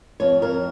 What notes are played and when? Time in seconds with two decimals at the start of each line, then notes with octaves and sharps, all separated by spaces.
0.20 F2 C#5
0.42 F2 A#4